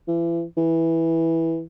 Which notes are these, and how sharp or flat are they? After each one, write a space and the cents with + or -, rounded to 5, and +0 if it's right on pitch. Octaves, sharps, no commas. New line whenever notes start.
E3 +35
E3 -10